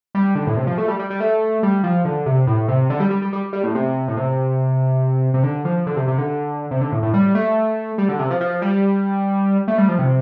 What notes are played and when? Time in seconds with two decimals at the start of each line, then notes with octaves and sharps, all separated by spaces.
0.15 G3
0.35 D3
0.47 A2
0.57 C3
0.67 F3
0.78 A3
0.88 G3
0.99 G3
1.10 G3
1.20 A3
1.63 G3
1.84 F3
2.05 D3
2.26 C3
2.47 A2
2.68 C3
2.90 D3
3.00 G3
3.10 G3
3.22 G3
3.33 G3
3.53 G3
3.64 A2
3.75 C3
4.08 A2
4.17 C3
5.34 C3
5.43 D3
5.65 F3
5.87 D3
5.96 C3
6.08 C3
6.18 D3
6.71 C3
6.81 D3
6.92 A2
7.03 A2
7.14 G3
7.35 A3
7.98 G3
8.09 D3
8.19 C3
8.30 F3
8.41 F3
8.62 G3
9.68 A3
9.78 G3
9.89 F3
9.99 C3